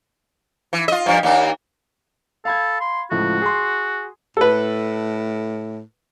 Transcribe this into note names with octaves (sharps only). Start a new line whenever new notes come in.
E3
F4 D#5
G2 F3
D#2 A#3 D4
A4 F5 B5 G#6
C6
C#2 A2 F3 F#4
G#4 C6
A2 A4 B4